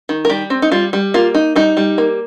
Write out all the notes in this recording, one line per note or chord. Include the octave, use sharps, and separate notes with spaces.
D#3
A#4
G3 G4
C4
D#4
G3 F4
G3
A#3 F4
D#4
G3 D#4
G3
A#3